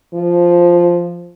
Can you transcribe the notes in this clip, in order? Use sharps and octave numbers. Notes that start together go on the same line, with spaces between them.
F3